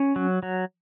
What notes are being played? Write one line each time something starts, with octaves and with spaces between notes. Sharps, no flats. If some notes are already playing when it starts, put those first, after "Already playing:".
Already playing: C#4
F#3
F#3